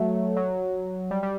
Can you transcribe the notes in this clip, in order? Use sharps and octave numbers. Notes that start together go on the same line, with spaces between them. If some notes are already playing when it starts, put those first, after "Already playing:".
Already playing: F#3 A3
F#3
G3
G3